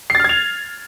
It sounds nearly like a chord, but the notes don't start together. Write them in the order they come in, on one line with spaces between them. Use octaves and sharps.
C7 A6 F6 G#6 F7